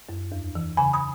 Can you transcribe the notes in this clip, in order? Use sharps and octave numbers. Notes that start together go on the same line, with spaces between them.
F#2
E2
E3
C#3 G#5 B5
B5 D#6